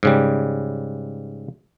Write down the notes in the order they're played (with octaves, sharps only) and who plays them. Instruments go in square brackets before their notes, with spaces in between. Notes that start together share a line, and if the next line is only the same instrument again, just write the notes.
[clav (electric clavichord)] G#2 C#3 G3